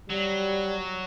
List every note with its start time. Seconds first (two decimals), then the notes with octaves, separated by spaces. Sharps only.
0.10 F#3 G3